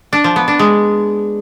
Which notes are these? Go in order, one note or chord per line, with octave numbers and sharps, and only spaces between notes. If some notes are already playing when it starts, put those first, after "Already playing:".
D4
F3
B3
D4
G#3